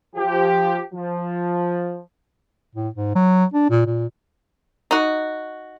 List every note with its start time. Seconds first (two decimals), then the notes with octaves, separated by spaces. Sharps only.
0.16 F3 G4
0.94 F3
2.75 A2
2.94 G#2
3.15 F#3
3.54 D4
3.70 A#2
3.86 A#2
4.91 D#4 F#4